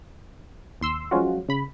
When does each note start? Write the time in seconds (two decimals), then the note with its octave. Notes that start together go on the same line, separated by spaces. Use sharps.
0.81 D#2 C6 E6
1.11 F3 F#3 G#3 C#4 F4 F#4
1.49 C#3 B5